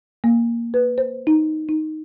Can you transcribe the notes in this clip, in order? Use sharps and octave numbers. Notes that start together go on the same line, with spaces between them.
A#3
B4
C5
D#4
D#4